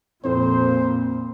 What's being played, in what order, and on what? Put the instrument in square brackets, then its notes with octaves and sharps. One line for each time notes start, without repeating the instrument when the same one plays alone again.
[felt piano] F2 [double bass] A#2 [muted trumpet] C5